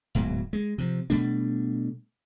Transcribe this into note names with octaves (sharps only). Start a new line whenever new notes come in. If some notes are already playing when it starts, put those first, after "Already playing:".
D1 G#2 B2 F#3
G#3
C3 F3
B2 G3 A3 D4